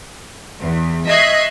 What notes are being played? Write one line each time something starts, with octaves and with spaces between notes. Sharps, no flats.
E2
D#5 E5 C#6 F#6 G#6 C7